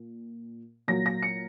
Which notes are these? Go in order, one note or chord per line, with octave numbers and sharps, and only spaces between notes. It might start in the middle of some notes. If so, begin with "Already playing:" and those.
Already playing: A#2
A#2 F#3 A#6
A#6
C#7